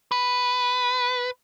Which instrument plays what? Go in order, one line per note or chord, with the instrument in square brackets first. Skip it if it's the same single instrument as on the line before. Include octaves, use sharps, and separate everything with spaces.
[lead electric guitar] B4